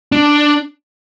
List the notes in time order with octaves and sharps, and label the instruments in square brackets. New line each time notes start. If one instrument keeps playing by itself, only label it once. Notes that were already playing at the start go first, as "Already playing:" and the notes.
[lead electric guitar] D4